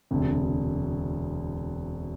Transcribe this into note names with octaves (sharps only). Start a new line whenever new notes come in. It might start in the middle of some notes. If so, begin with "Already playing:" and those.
E1 D2 C3